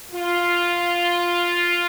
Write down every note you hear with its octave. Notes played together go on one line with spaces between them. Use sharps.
F4